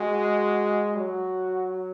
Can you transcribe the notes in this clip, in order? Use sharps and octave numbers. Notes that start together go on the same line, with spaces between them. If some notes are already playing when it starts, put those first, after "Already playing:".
Already playing: G#3 F#4
F#3 F#4